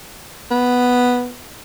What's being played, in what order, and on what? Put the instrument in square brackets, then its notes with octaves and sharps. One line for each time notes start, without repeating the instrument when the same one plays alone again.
[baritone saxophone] B3